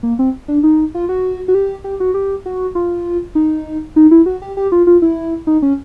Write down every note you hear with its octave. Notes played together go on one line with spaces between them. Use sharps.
A#3
C4
D4
D#4
F4
F#4
F#4
G4
G4
F#4
G4
F#4
F4
D#4
D#4
E4
F#4
G4
G4
F4
F4
E4
D#4
C#4